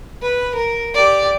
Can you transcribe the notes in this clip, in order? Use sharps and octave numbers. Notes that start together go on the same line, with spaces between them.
B4
A#4
G4 D5